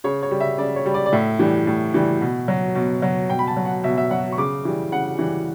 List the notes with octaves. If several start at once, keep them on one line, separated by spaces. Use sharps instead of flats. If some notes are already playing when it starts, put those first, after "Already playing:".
C#3 C#5
C#5
G3
E5
C#3 D5
C#5
G3
D5
D5
A2 E5
E3 G3
A2
E3 G3
B2
F#3
B2
F#3
B2 G5
B5
A5
F#3
F#5
B2 E5
E5
F#3 F#5
C#6
C#3 D6
E3 G3
C#3 F#5
E3 G3